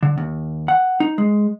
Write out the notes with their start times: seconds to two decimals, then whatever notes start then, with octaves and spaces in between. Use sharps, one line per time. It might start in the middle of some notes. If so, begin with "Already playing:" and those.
0.03 D3
0.18 D#2
0.68 F#5
1.00 D#4
1.18 G#3